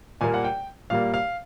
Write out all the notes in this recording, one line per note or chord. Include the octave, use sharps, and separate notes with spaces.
A#2 G3 A#3 G#5
F#5
G5
A#2 G3 A#3 F5
F5